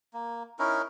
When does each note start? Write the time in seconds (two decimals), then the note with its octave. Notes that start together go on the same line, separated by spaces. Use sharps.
0.13 A#3
0.59 C#4 D#4 E4 A#4